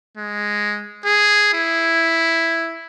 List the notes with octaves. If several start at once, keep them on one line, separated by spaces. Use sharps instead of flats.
G#3
G#4
E4